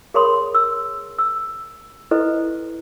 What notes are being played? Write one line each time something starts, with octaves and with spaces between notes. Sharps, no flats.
G#4 A#4 C#5 B5 C6 D#6
E6
E6
E4 A4 B4 C5 D#5